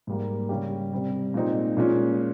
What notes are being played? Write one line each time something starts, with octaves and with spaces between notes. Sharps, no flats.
G#2 G3 A#3
C#3 G3 C#4 G4
C3 G3 C4
A#2 G#3 C4 D#4
A#2 F3 G#3 C#4